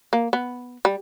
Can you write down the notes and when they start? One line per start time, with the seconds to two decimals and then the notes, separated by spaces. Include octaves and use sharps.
0.13 A#3
0.33 B3
0.85 G3